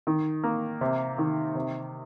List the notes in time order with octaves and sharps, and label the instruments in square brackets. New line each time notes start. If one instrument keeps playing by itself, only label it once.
[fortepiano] D#3
A#3
C3
D#3
C3